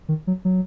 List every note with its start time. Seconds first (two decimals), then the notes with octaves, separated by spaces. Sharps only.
0.09 D#3
0.27 F#3
0.45 F#3